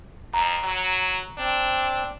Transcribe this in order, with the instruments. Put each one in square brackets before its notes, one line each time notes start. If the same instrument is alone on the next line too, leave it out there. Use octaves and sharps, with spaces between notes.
[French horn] F2 [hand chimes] A#5
[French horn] F#3
[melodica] C4 [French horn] D4